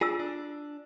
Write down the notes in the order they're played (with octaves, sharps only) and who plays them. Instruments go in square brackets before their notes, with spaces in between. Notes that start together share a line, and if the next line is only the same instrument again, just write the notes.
[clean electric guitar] D4 G#4 [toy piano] F4 E6
[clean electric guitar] D4